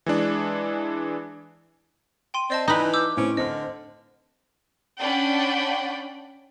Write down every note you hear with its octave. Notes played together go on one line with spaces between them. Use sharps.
E3 G#3 D4
G5 C6 D#7
C4 D5 D#5 A5
E3 D#4 B4
D6 E6 G6
A2 C4 C#4 D7
D3 C4 D#5 F6
C#4 D4 D5 F#5 G5 B5